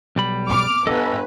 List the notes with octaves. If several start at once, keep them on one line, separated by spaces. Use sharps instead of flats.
B1 G3 B5
D6 F6
G1 A4 B4 D#5